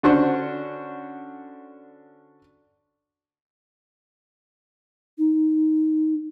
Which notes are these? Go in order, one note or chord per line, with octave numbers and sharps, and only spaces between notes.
D3 C#4 D4 F#4 C5 C#6
D#4